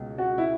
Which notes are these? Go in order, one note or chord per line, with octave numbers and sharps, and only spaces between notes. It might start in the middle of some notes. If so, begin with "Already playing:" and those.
Already playing: C#2 B2
F#4
E4